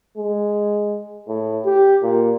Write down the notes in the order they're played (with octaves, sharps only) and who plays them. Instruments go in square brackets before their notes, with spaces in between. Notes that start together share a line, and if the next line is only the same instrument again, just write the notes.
[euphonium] G#3
A2
G4
A#2